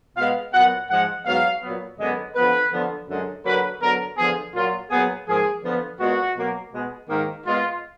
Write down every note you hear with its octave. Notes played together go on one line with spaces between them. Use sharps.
B2 G#3 B3 F5
A#2 F#3 B3 F#5
G#2 F3 G#3 F#5
G#2 F#3 B3 F5
A#2 F#3 B3
F#2 D3 G#3 B3 D#5
D3 F3 B3 B4
D3 F3 B3
F#2 D3 G#3
D3 F#3 A#3 B4
D3 F#3 B3 A#4
D3 F3 B3 G#4
A#2 F#3 A#3 F4
A#2 F#3 B3 G#4
G#2 F3 A#3 G#4
D3 F3 B3
A#2 G#3 B3 F#4
B2 F#3 A#3
B2 G#3 B3
G#2 D#3 A#3
A#2 G#3 B3 F4